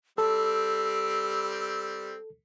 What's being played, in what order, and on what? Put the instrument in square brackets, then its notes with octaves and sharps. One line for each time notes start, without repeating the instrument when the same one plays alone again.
[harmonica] G3 C4 [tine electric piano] A4 [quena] E6